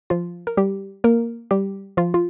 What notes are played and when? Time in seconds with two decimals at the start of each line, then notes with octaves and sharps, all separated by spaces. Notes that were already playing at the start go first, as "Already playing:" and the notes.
0.10 F3 F4
0.47 A#4
0.57 G3 G4
1.04 A#3 A#4
1.51 G3 G4
1.97 F3 F4
2.14 F4